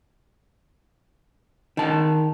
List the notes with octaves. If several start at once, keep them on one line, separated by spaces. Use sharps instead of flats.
D#3 A5